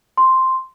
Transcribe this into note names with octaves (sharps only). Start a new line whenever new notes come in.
C6